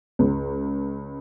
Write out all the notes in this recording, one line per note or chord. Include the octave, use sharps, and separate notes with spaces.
C#2